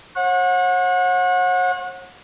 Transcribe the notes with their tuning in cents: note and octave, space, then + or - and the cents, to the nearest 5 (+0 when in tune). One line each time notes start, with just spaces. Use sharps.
C#5 -45 F#5 -30